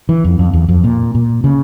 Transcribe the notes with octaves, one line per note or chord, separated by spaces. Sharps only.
E3
F2
F2
E2
F2
A#2
A#2
C#3